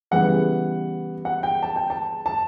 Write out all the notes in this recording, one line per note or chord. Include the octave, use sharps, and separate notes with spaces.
C#3 E3 G3 B3 F#5
F#5
G5
A5
G5
A5
A5